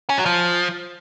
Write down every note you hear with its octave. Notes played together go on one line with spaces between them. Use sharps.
C#4
F#3
F3